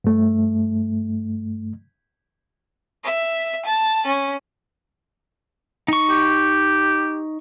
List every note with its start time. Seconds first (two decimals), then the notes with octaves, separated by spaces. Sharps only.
0.04 G2 A3
3.04 E5
3.65 A5
4.06 C#4
5.88 D#4 C#6
6.10 G4